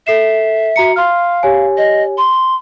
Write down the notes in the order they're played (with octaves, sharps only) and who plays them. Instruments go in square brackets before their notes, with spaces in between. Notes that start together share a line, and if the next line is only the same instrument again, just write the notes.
[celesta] A4 C7 E7 [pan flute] E5
[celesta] F#4 A#5 C#7
[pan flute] F5 [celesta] C6 F6
[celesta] G4 C#5 G#5
[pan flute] D#5
C6